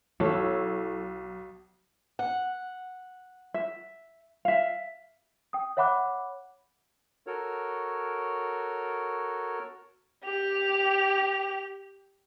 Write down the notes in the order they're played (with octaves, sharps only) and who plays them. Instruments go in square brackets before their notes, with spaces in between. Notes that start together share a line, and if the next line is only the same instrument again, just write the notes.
[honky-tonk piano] B1 [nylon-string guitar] E4 A4 C#5
[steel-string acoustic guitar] F#5
[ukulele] E5
E5 F5
[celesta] G5 D#6
C#5 E5 F#5 B5 D6 F#6
[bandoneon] F#4 A4 A#4 C#5
[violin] G4 F7